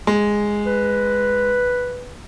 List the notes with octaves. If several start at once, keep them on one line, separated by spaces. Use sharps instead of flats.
G#3
B4